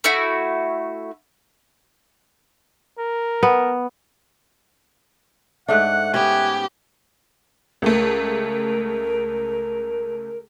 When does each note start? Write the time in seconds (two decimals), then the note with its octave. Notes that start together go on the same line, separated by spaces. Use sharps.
0.04 A3 E4 F#4
2.98 A#4
3.43 B3
5.68 G#2 A3 D4 E5 F#5 F#6
6.14 B3 C#4 G4 G#5
7.82 C#2 A3 A#4